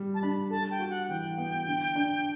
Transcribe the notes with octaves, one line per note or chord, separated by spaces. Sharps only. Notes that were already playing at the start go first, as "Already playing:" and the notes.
Already playing: G3
A5
D4 B5
A4 A5
G5
F#4
F#5
E3 G5
B3
D3
D4